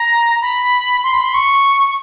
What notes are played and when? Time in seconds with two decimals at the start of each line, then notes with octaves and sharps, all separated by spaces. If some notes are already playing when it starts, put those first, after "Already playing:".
Already playing: A#5
0.42 B5
1.04 C6
1.13 B5
1.24 C6
1.34 C#6